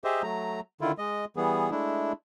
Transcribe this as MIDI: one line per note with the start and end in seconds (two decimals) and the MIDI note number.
0.04 0.22 67
0.04 0.22 68
0.04 0.22 72
0.04 0.22 75
0.04 0.22 76
0.23 0.60 54
0.23 0.60 57
0.23 0.60 82
0.81 0.92 50
0.81 0.92 51
0.81 0.92 64
0.81 0.92 65
0.98 1.25 56
0.98 1.25 75
1.37 1.70 52
1.37 1.70 55
1.37 1.70 59
1.37 1.70 68
1.71 2.12 56
1.71 2.12 57
1.71 2.12 62
1.71 2.12 64